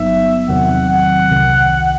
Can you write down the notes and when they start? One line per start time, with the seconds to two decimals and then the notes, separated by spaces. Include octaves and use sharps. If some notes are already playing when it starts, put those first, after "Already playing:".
Already playing: G1 G2 F#3 B3 D#4 E5
0.48 E2 C3 D#3 F#3 C4 F#5
0.90 F#5
1.31 C2 C3 D#3